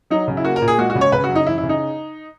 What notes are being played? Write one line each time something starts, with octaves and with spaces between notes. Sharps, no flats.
F#3 D#4
C#3
E4
A#3 F#4
A#4
A#2
G#4
G#3 F#4
F#4
C#3
C#5
C#3 B4
F#4
F#2
D#4
E3 E4
E4
C#3
D#4